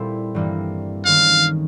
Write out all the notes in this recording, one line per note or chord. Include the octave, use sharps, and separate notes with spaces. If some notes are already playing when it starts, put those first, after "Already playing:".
Already playing: A#2 G3 C4 E4 A4
G2 E3 G3 A#3
D#3 G#3 C#4 F5